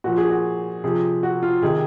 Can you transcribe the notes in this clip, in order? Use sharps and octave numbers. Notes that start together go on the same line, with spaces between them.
A#2 F3 F#4
G#4
F#4
C3 F3 G#4
F#4
F4
C3 D#3 G#4